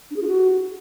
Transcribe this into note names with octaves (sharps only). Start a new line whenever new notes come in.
D4
G#4
F4
F#4